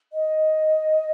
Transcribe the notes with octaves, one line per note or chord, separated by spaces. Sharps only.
D#5